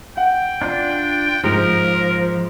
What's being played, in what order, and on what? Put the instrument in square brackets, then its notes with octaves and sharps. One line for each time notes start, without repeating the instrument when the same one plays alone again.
[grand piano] F#5 [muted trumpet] G5
[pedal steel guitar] D4 F4
[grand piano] G#2 [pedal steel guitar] F3 [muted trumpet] A#4